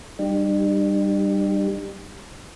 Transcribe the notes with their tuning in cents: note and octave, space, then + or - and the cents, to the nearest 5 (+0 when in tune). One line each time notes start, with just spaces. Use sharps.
G3 +0 D4 +45 G4 +10